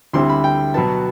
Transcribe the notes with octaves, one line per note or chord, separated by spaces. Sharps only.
D2 D3 G3 C4 E4 C6
B5
G5
B2 F#3 B3 A5